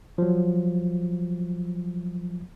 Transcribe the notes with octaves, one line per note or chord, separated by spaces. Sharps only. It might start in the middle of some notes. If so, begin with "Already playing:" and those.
F3 F#3